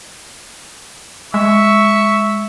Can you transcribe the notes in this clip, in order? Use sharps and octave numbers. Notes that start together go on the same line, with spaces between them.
G#3 E5 C#6